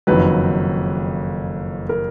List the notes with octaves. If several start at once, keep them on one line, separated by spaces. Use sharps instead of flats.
F#1 F2 D#3 F#3 B4
A#4